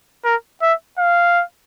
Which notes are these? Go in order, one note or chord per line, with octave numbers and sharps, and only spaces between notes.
A#4
E5
F5